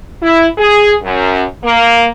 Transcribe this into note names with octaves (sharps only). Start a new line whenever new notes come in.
E4
G#4
F#2
A#3